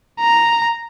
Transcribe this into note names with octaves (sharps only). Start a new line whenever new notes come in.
A#5